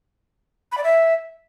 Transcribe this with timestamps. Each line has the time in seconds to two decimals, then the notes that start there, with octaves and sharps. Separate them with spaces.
0.72 B5
0.78 D5
0.84 E5